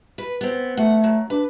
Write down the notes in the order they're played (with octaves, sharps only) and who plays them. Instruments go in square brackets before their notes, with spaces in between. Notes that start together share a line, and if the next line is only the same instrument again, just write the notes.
[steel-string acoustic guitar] B4
B3 C4
[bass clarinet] A3 [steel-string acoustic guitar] F#5
[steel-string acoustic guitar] F#3
[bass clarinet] D4 [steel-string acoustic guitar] B4